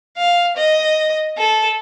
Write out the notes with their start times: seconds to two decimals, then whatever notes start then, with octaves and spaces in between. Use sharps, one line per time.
0.17 F5
0.57 D#5
1.37 A4